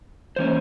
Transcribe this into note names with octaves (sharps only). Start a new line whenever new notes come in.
E3 A#3 C#4 C5